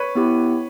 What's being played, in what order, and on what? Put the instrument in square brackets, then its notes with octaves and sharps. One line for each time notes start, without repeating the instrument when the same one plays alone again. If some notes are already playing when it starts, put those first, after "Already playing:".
Already playing: [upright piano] B4 C#5
[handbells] B3 E4 G4